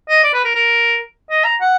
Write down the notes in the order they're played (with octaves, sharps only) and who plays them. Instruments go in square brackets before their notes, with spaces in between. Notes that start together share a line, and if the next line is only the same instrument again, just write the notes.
[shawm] D#5
D5
B4
A#4
A#4
D#5
A#5
F#5